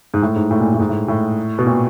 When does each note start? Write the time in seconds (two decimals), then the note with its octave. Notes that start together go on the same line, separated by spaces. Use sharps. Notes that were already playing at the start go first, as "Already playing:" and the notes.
0.14 G#2
0.22 A2
0.36 G#2
0.51 A2
0.61 A#2
0.74 A2
0.79 G#2
0.89 A2
1.08 A2
1.59 B2
1.66 A#2